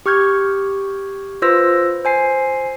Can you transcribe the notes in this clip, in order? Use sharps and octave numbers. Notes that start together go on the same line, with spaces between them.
G4 C#6 F6 G6 G#6
F4 B4 C5 E6 A#6
C5 G#5 C7